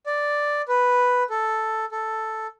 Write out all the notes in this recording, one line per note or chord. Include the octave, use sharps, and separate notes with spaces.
D5
B4
A4
A4